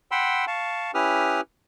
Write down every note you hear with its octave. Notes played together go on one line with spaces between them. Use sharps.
F#5 G5 B5 C6 E6
F5 A5 C#6
C#4 E4 G4 B4 D#6 F6